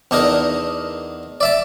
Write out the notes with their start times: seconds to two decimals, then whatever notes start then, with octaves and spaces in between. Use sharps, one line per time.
0.11 E2 D4 D#4 A#4
1.41 D5 E5 A5